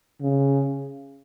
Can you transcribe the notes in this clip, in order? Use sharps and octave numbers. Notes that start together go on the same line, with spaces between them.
C#3